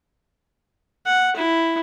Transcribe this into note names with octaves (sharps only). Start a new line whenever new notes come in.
F#5
E4